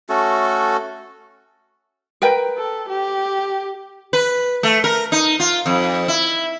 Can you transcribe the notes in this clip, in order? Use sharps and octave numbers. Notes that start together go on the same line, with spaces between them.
A3 C#4 F#4 A4
A#4 B4 G5
A4
G4
B4
A3
A#4
D#4
F4
F2
E4